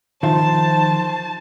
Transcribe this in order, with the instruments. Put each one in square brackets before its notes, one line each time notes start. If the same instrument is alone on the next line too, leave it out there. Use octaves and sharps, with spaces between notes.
[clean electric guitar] D#3 [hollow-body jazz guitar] F3 F4 E5 [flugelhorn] C5 [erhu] A5